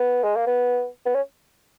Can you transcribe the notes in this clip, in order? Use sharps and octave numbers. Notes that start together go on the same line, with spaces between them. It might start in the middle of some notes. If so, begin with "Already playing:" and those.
Already playing: B3
G#3
A#3
B3
B3
C#4